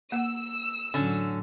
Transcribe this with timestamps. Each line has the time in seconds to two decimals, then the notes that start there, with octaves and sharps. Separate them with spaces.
0.12 A#3 F#5 E6
0.94 A2 D3 F#3 C#4